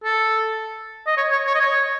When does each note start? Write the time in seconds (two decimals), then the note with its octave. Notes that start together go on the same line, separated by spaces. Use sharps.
0.03 A4
1.07 D#5
1.17 C#5
1.32 C#5
1.46 C#5
1.55 D#5
1.60 C#5